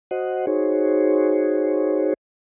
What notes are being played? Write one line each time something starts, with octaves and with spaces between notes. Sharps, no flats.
F#4 C5 D#5 F#5
D#4 F#4 G#4 C5 C#5